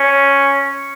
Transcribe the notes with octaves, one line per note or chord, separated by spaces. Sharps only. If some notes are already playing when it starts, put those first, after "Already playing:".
Already playing: C#4